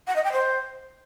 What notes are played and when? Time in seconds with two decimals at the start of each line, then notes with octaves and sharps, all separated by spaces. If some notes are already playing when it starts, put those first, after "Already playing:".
0.07 F#5
0.16 D#5
0.24 G5
0.32 C5